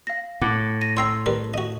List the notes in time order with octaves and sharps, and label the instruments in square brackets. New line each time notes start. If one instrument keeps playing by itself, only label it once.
[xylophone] F5 A#6
[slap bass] A2 [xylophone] F#5 D6 F#6
[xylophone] A#6 D#7
[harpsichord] C#5 G5 A#5 [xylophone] C6 E6 C7
[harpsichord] G3 A#4 B4
F#4 D#5